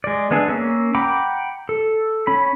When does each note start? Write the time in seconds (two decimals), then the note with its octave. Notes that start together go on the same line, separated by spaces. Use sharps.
0.04 G#3 D5
0.31 G#3 B3 D4 G#4 E5
0.48 A#3 C#4 E6
0.95 F#5 G5 A#5 B5 D6
1.69 A4
2.27 C#4 B5